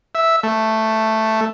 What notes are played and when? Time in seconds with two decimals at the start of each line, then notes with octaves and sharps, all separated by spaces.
0.15 E5
0.43 A3